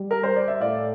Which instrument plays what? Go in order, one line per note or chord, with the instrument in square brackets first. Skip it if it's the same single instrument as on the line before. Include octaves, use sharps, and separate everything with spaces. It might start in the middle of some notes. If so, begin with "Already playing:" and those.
Already playing: [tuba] G3
[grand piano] A#4
C5
D5
E5
[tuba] A2 [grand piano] D5 F5